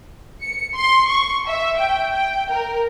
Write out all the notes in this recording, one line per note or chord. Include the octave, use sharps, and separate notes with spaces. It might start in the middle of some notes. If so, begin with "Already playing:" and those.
C#7
C6
C#6
E5
G5
G5
A#4